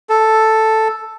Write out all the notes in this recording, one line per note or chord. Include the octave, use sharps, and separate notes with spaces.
A4